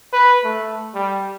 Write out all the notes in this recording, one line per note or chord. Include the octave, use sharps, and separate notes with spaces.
B4
A3
G3